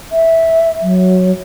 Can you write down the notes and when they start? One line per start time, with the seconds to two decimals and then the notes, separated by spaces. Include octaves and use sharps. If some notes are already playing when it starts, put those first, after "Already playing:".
0.12 E5
0.82 F#3